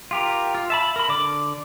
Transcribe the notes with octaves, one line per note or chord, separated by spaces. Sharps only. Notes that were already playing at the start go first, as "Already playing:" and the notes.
F4 G4 A#4
F4
E5 A5 B5
A#4 B5
D3 D5 D6